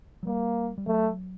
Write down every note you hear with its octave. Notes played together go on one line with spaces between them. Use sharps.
F#3
G3 A#3
G3
F#3 A3